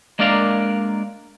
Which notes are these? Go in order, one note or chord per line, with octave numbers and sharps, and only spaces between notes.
G#3 A#3 D4 A#4 D5 F5